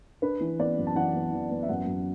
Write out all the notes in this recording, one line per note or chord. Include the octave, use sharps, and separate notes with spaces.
D4 B4
E3
B3 D5
F#2
A5
E3 F#5
B3
E3
B3
E5
F#2 F#5
F#2